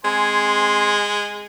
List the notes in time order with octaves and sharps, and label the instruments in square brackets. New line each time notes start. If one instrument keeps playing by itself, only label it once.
[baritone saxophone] G#3 [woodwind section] C4 G#5 C6